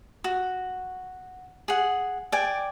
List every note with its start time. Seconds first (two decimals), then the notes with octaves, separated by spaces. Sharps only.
0.24 F#4
1.68 G#4 F#5
2.32 D5 G5 G#5